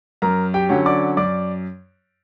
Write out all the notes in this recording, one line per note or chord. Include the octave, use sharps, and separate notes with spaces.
F#2 A#4 A#5
G4 G5
D3 F#3 C#4
D5 D6
F#2 D5 D6